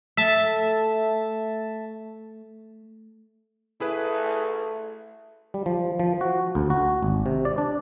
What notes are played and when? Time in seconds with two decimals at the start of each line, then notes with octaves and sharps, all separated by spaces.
0.17 A3 E5 A5
3.80 A3 E4 G#4 B4
5.54 G3
5.66 F3
6.00 F3
6.21 F#4
6.55 D2
6.70 F#4
7.03 G#1
7.26 C3
7.45 D5
7.58 D4